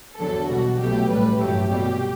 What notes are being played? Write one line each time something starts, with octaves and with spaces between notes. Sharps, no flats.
E2 D3 F#3 A4
B1 B2 G3 F#4
C2 B2 F#3 A3 G4
A1 A2 G3 B4
A1 G2 F#3 A3 G4
C2 B2 G3